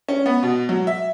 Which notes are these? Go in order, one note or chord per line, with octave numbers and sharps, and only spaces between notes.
C#4
B3
B2
F#3
E5